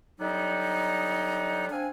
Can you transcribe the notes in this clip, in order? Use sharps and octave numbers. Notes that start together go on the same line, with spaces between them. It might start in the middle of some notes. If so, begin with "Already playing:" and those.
D3 F#3 G3 B3 D#4
C4 D4 F5 G#5